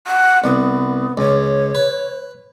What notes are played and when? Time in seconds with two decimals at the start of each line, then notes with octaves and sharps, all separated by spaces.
0.07 F#5
0.44 C2 B3
1.17 C#2 C#5
1.75 B4